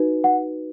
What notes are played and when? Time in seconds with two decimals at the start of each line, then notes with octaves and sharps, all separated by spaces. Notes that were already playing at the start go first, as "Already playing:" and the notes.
Already playing: D#4 F#4 B4
0.24 F#5